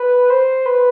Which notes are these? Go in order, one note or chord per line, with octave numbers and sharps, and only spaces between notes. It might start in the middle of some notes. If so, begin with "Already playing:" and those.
Already playing: B4
C5
B4